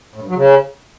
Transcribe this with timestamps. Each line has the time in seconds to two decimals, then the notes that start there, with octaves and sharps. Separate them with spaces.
0.16 A2
0.22 G2
0.29 F#3
0.35 C#3